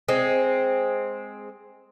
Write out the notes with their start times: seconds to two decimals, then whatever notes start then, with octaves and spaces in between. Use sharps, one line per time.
0.08 G#3 C4